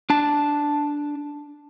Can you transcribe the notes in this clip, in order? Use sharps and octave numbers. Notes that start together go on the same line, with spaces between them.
D4 A5